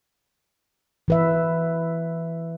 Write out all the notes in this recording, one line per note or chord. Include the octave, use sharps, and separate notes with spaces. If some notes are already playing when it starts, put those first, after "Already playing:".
E3 B4 E5